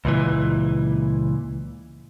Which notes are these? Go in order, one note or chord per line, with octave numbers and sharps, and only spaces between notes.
C#2 A#2 E3